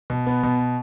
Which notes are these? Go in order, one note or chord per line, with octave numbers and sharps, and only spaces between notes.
B2
B3
B2